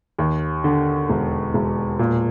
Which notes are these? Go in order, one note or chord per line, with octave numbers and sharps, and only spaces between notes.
D#2
D3
E1
E1
A#2